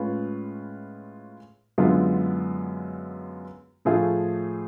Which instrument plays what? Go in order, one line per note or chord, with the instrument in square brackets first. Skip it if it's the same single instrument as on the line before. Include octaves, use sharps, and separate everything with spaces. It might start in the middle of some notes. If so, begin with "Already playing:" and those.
Already playing: [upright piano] A2 G#3 C#4 F4 B4
F#2 D3 G#3 B3 F4
A2 F3 A3 F4 G#4